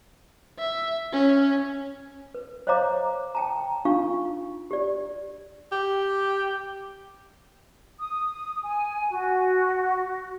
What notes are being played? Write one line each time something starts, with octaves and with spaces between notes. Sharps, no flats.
E5
C#4
B4
C5 C#5 D#5 F5 A#5 D6
G5 A5 A#5
D4 D#4 F4 F5 C#6
G4 D5
G4
D#6
G#5
F#4